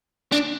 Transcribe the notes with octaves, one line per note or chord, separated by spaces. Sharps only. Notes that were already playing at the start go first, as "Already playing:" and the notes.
D4